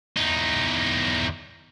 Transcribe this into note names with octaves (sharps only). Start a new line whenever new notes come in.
E2 D#4